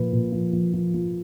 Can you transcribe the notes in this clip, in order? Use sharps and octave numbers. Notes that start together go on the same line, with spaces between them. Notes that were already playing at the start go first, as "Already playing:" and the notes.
Already playing: A#2 F3 B4
A#2
F3
F3
F3
F3